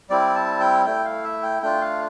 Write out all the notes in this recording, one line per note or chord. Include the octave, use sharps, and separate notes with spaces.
G3 C4 E4 D5
A5
G5
A3 E4 G5
F5
E5
G5
A3 D4 F4 G5
F5